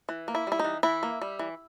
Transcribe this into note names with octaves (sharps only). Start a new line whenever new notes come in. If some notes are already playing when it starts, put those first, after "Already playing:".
E3
A#3
E4
G3 E4
D#4
E3
E3 E4
A#3
G3
E3